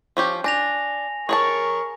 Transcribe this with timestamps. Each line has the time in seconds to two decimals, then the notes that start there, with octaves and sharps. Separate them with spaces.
0.17 F3 C#4 G4
0.44 D4 G#5 A#6 F7
1.29 G#4 A#4 C#5 A5 C#6